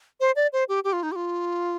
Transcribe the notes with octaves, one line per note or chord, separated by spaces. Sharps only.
C5
D5
C5
G4
G4
F4
D#4
G4
F4